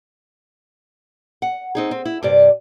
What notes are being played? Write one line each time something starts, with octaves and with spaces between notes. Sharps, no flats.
F#5
C4 D#4 G#4
C4
E4
G2 C3 D5